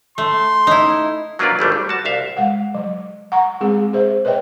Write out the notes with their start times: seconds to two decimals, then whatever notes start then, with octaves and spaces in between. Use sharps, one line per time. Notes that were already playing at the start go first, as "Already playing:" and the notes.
0.18 A3 C6
0.67 D#4 E4
1.39 F#3 A#3 D4 F4 B4 D5
1.59 G#1 G3 A3 D4
1.72 G3
1.89 F#4 A5
2.05 C2 E5 F5
2.37 G#3 F5 F#5
2.75 F#3
3.32 F#5 A#5 C#6
3.61 G#3 C4 G#4
3.93 G#4 C5 E5
4.25 B4 C#5 D#5 E5 G5